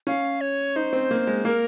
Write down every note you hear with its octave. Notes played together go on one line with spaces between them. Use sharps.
C#4 F5
C#5
D#4 C5
C4
A#3
G#3
A#3 A#4